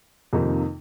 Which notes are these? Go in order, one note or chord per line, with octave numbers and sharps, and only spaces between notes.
F2 C3 D#3 A#3 D#4